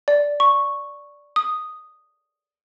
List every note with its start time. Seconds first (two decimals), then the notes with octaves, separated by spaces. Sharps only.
0.08 D5
0.40 C#6
1.36 D#6